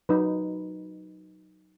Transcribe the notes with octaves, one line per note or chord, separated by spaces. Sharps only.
F#3 D#4 B4